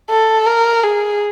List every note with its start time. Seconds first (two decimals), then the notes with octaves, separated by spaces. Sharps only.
0.10 A4
0.46 A#4
0.83 G#4